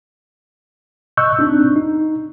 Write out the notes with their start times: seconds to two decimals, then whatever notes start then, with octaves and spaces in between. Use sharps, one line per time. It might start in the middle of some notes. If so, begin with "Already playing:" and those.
1.17 D#5 C#6 E6 F#6 G6
1.39 C4 D4 D#4
1.76 D#4